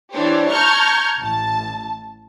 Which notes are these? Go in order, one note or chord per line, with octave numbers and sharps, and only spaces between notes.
E3 D4 G4 C5 C#5
A5 A#5 C#6 F6 G6 G#6
A1 A5